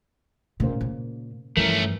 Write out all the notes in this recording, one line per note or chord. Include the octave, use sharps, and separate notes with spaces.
A#2 C#3 A#3 C5
A#2
G2 E3 F3 A3 C#4 A#4